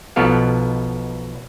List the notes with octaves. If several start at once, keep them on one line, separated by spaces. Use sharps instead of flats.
B1 B2 F3 B3 A4 F5